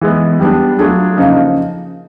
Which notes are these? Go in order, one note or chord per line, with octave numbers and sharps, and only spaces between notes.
E3 G#3 B3
G3 B3 D4
F#3 A3 D4 F4 G#4
C#3 F3 A#3 D#4